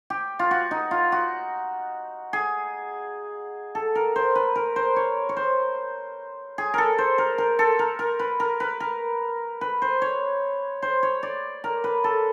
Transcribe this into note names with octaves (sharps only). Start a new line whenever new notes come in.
G4
F4
F#4
D#4
F4
F#4
G#4
A4
A#4
C5
B4
A#4
C5
C#5
C#5
C5
G#4
A4 A#4
C5
A#4
A#4
A4
A#4
A#4
B4
A#4
B4
A#4
B4
C5
C#5
C5
C#5
D5
A#4
B4
A4